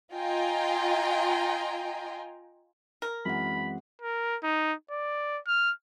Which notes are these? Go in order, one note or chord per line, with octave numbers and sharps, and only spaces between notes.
F4 D#5 G5 G#5 A#5 C6
A#4
F#2 E3 G#3 C4 F#5 B5
A#4
D#4
D5
F6